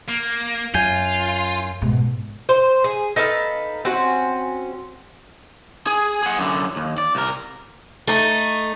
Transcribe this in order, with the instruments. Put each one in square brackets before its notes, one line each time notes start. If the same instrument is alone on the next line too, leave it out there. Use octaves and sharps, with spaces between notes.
[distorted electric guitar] A#3
[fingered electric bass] F#2 [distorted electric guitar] F4 [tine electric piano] G#5 G6
[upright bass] G#2 B2
[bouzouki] C5
G#4
D#4 A4 B4 F5
C4 C#4 F#4
[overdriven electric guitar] G#4
G#4 F#5
F#2 D3
D#2
D5
C2 A#4
[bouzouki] A3 D#4